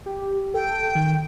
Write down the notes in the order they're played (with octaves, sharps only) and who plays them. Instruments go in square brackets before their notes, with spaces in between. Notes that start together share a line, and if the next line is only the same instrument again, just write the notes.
[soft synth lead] G4
[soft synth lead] A4 [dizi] G5
[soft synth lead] D#3